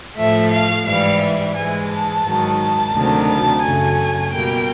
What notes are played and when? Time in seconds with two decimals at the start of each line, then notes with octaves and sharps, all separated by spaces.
0.17 A2 F3 A3 E5
0.51 F5
0.86 G#2 E3 G3 F5
1.20 E5
1.54 G#2 E3 G#3 G#5
1.89 A5
2.23 G#2 D#3 F#3
2.58 A5
2.92 D2 C3 D#3 F#3
3.28 A5
3.61 F#2 C#3 F#3 A3 G#5
4.31 B2 G3 A#3 G5